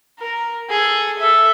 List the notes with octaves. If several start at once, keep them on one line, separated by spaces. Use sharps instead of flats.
A#4
G#4 A4
A4 E5